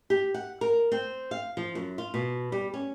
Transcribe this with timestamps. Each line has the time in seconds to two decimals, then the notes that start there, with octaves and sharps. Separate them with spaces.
0.10 G4
0.34 F#5
0.61 A#4
0.92 C4
1.31 F5
1.57 F3
1.75 F#2
1.98 F4
2.14 B2
2.52 G3
2.74 C#4